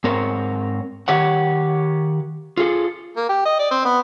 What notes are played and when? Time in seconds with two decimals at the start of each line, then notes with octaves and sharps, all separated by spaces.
0.04 G#2 C4 A#4 C#5
1.08 D#3 G4 C#5 F#5
2.57 F4 G#4 A4
3.17 A#3
3.29 G4
3.45 D#5
3.59 D5
3.71 C4
3.85 B3